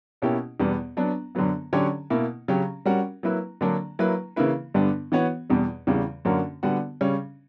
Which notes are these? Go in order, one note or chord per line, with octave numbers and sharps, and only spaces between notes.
B2 A#3 C#4 E4 G4
E2 B2 G3 B3
F#3 B3 D4
F#2 D3 F#3 B3
D3 F#3 C#4 G4 C#5
B2 A#3 E4
C#3 F#3 C#4 G4
G3 C#4 F#4 A#4
F#3 A#3 E4 B4
D3 F#3 A#3 D4
F#3 A#3 E4 B4
C#3 E3 A#3 E4 B4
G2 D3 G3 B3 D4
E3 B3 F#4 C#5
E2 B2 G3
E2 C#3 E3 G3
F#2 D3 A#3 C#4 F#4
D3 G3 B3 F#4
C#3 G3 C#4